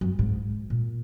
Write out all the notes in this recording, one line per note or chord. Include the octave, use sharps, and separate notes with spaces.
F#2
G#2
A#2